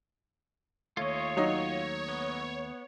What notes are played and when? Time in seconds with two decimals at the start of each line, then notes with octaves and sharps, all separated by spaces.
0.97 D#2 A3 F4 C#5 D#5
1.37 F#3 D#4
2.08 B3